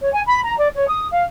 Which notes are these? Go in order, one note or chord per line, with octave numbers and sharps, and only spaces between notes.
C#5
G#5
B5
A#5
D5
C#5
D#6
F5